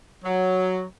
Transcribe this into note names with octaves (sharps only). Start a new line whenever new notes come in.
F#3